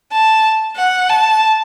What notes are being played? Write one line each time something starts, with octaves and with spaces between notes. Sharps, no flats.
A5
F#5
A5